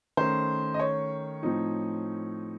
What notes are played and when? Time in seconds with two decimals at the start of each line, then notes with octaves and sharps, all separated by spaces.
0.17 D#3 A3 C#4 C5
0.74 D#5
0.79 C#5
1.43 A2 F3 C4 D#4